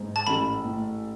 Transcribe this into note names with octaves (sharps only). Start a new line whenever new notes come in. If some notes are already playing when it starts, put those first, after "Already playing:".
Already playing: G#2
A5
A1 B5
A2